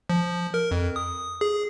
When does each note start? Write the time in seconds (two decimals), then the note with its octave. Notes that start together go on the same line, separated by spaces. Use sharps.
0.10 F3
0.54 A#4
0.71 F2
0.96 D#6
1.41 G#4